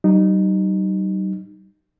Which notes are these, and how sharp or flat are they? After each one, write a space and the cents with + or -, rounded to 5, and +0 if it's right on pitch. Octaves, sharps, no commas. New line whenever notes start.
G3 -45 D#4 -20